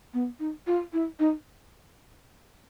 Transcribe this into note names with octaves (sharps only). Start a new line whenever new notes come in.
B3
D#4
F4
E4
D#4